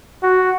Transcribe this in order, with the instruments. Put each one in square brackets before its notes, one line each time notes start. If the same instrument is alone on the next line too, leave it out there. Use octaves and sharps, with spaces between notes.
[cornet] F#4